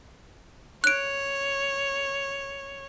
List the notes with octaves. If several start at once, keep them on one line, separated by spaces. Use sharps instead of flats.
C#5 F#6 D7